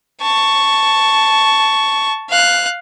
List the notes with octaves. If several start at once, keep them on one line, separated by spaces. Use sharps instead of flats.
A5 C#6
F5 F#6